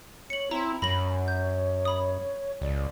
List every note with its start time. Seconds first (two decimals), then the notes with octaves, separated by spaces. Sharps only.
0.30 C#5 C#7 F#7
0.51 C4 E4 A#5
0.82 F#2 C#5 B5 A#6 F#7
1.28 G6
1.85 B5 D#6
2.61 C#2 D5